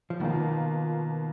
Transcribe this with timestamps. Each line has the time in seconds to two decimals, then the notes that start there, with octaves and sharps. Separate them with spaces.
0.10 F3
0.20 B2 D#3 A#3 F4